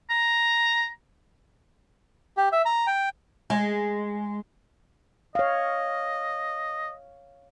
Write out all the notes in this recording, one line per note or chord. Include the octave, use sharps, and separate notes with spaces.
A#5
G4
E5
A#5
G5
G#3
C#5 D#5 F5